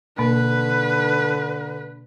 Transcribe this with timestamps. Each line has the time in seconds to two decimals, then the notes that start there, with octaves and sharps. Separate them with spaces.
0.18 B2 D3 A#3 B4